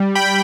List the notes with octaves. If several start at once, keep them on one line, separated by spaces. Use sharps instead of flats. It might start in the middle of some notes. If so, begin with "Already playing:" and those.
Already playing: G3
G5 B5